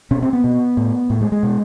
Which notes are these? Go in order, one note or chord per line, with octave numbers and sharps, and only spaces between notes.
B2 C#4
C4
B3
B2
A2
A2
G#3
G#3
B2